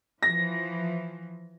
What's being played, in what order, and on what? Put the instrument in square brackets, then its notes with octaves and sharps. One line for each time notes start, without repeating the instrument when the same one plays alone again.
[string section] E3 F3 [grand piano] A#6